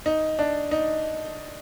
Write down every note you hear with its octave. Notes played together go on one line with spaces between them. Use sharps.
D#4
D4
D#4